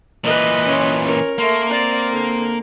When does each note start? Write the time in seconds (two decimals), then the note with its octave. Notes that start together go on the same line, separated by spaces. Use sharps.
0.24 A#2 E3 B4 D#5
0.66 C#4 F4
1.05 C#4 A#4
1.38 A3 A#3 C6
1.70 C4 D5
2.12 D3